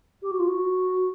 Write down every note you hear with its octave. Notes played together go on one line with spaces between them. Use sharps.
G4
F#4
F4
F#4